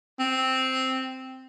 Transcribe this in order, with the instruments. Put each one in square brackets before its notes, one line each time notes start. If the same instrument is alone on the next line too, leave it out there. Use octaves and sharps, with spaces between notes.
[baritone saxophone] C4